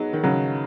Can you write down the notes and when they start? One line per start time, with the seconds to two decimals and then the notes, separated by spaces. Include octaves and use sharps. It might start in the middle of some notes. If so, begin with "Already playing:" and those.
Already playing: F#3 B3 D#4 G#4 D#5
0.13 D#3
0.23 C#3 F#3